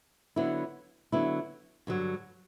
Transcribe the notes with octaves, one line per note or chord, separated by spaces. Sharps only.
D3 F#3 B3 E4
D3 F#3 B3 E4
G2 D3 F#3